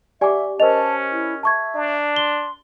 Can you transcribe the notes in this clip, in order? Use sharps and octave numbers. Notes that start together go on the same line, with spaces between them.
G4 D5 E5 F#5 G#5 D6
C#4 A#4 C5 D#5 A5 F7
E4
E5 A5 C#6 G#6
D4
C6 G7